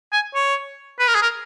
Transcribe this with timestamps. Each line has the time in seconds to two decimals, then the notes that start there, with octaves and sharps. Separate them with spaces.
0.12 G#5
0.35 C#5
0.99 B4
1.08 A#4
1.15 G#4
1.22 A#4